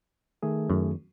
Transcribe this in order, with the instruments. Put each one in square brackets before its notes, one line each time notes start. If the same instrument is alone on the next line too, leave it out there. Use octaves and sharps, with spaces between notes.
[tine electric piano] D#3 A3 G#4
[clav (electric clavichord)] F#2